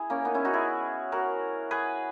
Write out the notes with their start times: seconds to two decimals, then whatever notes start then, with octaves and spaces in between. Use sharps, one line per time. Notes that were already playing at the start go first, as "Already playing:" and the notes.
Already playing: E4 G#4
0.10 A#3 C#4
0.25 B3 D#4
0.34 C#4 E4
0.45 D#4 F#4
0.54 E4 G#4
1.12 F#4 A#4
1.71 G#4 B4